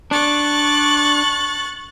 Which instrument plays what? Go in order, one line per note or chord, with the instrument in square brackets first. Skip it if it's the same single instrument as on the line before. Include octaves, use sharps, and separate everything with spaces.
[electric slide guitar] D4 [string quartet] C#6 F#6 A6